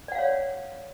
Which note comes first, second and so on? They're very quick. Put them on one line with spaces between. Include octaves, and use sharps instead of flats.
D5 F#5 F5 C#5